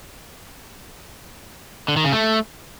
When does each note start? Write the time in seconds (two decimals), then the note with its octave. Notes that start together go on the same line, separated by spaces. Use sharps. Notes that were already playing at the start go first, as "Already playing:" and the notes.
1.88 D3
1.96 D#3
2.05 C#3
2.13 A3